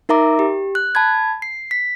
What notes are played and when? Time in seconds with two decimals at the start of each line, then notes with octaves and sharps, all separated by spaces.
0.09 D#4 A#4 E5 A#5 D6
0.39 G4
0.75 F#6
0.95 A5 B5 G#6
1.42 C7
1.71 B6